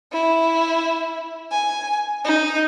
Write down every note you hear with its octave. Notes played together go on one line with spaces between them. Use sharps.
E4
G#5
D#4